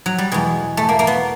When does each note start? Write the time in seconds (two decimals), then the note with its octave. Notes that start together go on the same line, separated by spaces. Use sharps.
0.06 F#3
0.18 G3
0.32 E2 B2 G#3
0.77 A3
0.89 A#3
0.99 A#3
1.07 B3